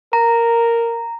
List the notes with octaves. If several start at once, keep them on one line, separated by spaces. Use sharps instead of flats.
A#4 A#5